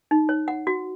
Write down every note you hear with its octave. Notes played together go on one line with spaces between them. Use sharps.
D#4
C#5
F#5
F#4